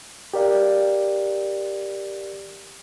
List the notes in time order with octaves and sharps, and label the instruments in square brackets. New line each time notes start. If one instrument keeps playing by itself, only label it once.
[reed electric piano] G4 A#4 D5 F5